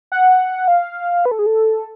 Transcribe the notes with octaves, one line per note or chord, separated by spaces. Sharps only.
F#5
F5
B4
A4
G#4
A4